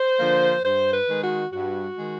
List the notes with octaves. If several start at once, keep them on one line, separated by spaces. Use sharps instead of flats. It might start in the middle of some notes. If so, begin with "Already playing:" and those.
Already playing: C5
D3 F3 A#3
G2 C5
B4
D#3 G#3
F#4
G2 F#4
D#3 G#3